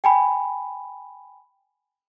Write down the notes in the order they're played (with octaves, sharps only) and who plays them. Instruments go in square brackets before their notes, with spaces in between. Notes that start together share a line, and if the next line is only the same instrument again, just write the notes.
[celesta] G5 G#5 B5